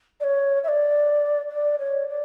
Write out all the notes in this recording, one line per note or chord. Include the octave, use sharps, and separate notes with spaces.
D5
C#5
E5
D5
D5
C#5
D5